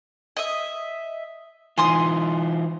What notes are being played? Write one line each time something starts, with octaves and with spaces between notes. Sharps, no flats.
D#5 E5
E3 D#4 F4 G#5 C6 D#6